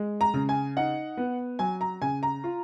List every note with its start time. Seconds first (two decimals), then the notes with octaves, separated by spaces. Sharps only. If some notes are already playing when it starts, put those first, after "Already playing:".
Already playing: G#3
0.21 A#5
0.34 C#3
0.49 G#5
0.77 D#4 F#5
1.17 B3
1.59 F#3 G#5
1.81 A#5
2.02 C#3 G#5
2.23 A#5
2.44 F4